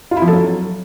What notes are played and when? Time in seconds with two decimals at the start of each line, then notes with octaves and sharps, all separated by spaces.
0.11 F4
0.17 E4
0.22 F3
0.27 A4
0.33 F#3